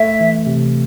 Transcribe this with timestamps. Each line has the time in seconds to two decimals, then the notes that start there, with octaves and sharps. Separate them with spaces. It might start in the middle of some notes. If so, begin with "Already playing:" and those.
Already playing: A3 E5
0.20 E3
0.46 C3